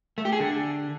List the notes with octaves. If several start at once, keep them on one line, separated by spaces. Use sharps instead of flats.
A3
G4
G#4
D3